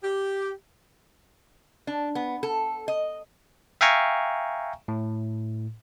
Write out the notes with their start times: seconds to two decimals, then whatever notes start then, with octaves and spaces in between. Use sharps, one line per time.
0.03 G4
1.87 D4
2.15 B3
2.43 A4
2.88 D#5
3.81 E5 F5 G5 G#5 A#5 C#6
4.88 A2